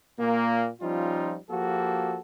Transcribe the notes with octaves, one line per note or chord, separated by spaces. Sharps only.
A#2 A#3
F3 G3 C#4 D#4 F4
F3 A#3 F#4 G4 A4